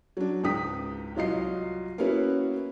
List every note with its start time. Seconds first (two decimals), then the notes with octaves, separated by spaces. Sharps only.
0.17 F#3 D4
0.43 C#2 G#2 G5 D#6 B6
1.15 C2 F#3 F4 D#5 C7
1.98 A#3 B3 C#4 E4 F#4 B4